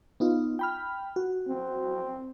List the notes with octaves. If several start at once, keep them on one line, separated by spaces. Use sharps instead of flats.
B3 D#4 F4
G5 B5 F6
F#4
C4